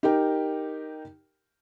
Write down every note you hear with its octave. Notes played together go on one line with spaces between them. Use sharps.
D#4 G4 A#4 G5